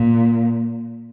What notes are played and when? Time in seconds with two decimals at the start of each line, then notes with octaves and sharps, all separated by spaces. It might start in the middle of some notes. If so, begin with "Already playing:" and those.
Already playing: A#2